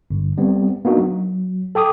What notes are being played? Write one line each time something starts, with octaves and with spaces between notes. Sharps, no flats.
G1
G3 B3 C4
A#3 B3 D4 D#4 F#4
F#3
A4 G5 D6 D#6